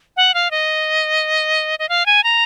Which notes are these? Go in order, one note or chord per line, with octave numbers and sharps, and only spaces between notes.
F#5
F5
D#5
D#5
F5
G#5
A#5